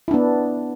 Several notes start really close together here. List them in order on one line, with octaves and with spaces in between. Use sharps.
E4 D4 B3